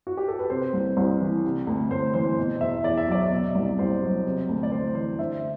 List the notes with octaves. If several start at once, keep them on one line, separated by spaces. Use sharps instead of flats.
F#4
G4
A4
B4
C3 C5
C2
C2
E3
C3
D2
D2 C5
E3 C5
B2
E2 E5
E2 D5
E5
F#3 D5
B2
C2
C2 C5
F#3
C3
D2
D5
D2 C5
E3 C5
D3 E5